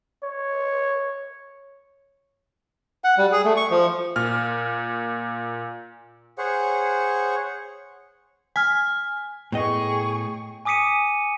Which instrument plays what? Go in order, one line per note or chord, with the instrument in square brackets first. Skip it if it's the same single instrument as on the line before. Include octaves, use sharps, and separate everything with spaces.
[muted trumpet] C#5
[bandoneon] F#5
G3
G#4
A3
C#6
F3
[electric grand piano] A#2 F6
[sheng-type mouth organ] G#4 C5 C#5 F#5
[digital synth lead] G#5 [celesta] F6 B6
[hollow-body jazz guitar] A2 B3 D#5 [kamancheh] G#4 C#6 [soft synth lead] G5
[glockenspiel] G#5 D6 D#6 B6 C#7 D#7